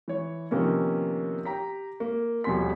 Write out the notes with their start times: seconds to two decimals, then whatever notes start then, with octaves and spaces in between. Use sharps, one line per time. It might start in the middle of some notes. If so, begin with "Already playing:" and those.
0.08 E3 C#5
0.51 C3 D#3 F3 A#3 B3 C#4
1.45 G4 G5 A#5 B6
2.00 A#3
2.44 D#1 A#1 B2 G#5 C6 B6